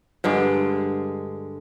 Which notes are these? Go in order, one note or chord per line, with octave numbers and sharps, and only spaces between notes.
G2 D3 G#3 A#4